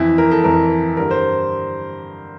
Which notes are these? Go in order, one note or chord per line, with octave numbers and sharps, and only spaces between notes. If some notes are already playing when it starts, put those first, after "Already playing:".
Already playing: F2 E3 E4
A#4
A4
F2 E3 A#4
G2 D3 A#4
C5